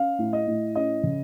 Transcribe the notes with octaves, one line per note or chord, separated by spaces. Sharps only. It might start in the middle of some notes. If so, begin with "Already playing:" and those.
Already playing: C#4 F5
A2
D#5
A2
C#4 D#5
C#3